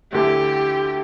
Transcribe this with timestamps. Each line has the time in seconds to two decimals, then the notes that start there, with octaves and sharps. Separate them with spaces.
0.12 D2 D3 A3 E4 G4